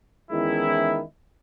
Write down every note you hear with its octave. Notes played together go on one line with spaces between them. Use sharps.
E2 D#3 G#3 C#4 E4